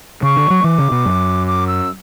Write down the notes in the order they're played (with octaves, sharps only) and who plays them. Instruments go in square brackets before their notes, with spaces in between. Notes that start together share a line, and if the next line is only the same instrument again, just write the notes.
[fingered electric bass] C#3 [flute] C#6
[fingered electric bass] D3
F#3
[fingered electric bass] E3 [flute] D6
[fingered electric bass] C#3
B2
F#2
[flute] D6
E6